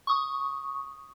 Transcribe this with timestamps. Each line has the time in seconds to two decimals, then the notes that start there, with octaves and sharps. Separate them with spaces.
0.07 C#6 D#6